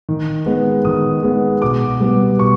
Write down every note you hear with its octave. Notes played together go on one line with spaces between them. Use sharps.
D#3
G#3 B3
D#3 D#6
G#3 B3
B2 D6
G3 B3
B2 C#6